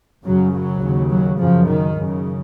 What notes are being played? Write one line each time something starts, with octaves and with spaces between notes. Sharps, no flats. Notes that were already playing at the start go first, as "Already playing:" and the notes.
F#2 C#3 F#3
F#3
D#2 C#3
F#3
F#2 C#3 F3
D#3
F#2 C#3